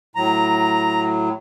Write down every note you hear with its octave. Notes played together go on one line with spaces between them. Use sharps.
A2 F#3 A#5